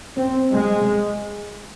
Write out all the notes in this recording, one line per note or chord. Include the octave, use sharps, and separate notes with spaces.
C4
G#3